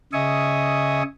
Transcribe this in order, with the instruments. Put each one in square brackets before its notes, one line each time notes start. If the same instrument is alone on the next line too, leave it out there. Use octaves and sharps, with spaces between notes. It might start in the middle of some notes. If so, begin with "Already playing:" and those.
[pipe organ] C#3 D#5 E5 G#5 C#6 D#6